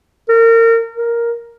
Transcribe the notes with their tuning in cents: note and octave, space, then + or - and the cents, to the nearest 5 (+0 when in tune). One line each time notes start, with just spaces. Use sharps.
A#4 -30
A#4 +5